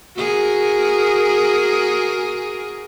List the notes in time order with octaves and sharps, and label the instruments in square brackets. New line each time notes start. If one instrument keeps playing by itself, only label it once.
[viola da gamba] F#4 G#4 A#4